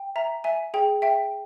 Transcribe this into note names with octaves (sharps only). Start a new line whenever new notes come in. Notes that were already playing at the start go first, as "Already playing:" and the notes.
Already playing: G5
E5 A#5
E5 G#5
G#4 G5
E5 G5